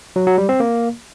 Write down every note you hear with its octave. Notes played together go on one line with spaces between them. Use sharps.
F#3
F#3
G3
C4
A#3